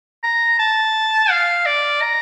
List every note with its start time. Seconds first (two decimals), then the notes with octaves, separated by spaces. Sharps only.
0.23 A#5
0.59 A5
1.30 F5
1.66 D5
2.02 A#5